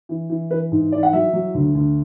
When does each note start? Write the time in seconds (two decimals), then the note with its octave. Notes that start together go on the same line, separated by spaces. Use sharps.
0.09 E3
0.30 E3
0.51 E3 B4
0.72 G#2
0.92 E3 D5
1.03 F#5
1.13 F#3 E5
1.33 F#3
1.55 D2
1.75 D2